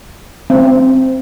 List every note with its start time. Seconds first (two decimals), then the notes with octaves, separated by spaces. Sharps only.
0.50 C4